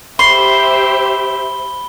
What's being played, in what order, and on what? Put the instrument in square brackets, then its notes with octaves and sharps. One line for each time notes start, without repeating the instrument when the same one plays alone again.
[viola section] G4 C5 E5 [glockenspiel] B5 G7 [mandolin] C6